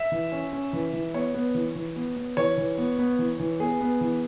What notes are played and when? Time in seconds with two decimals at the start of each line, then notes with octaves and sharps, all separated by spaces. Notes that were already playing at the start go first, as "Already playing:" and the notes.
Already playing: E5
0.12 E3
0.32 C#4
0.53 C#4
0.73 E3
0.93 E3
1.14 B3 C#5
1.34 B3
1.55 E3
1.75 E3
1.96 B3
2.16 B3
2.37 E3 C#5
2.58 E3
2.78 B3
2.99 B3
3.19 E3
3.40 E3
3.60 B3 G#4
3.81 B3
4.01 E3